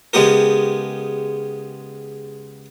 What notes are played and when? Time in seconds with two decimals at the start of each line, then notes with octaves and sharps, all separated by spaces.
0.13 C#3 G#3 B3 G4 A#4